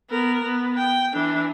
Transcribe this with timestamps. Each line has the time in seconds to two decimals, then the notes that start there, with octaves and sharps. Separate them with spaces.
0.10 B3 A#4
0.44 B3
0.78 G5
1.13 E3 D4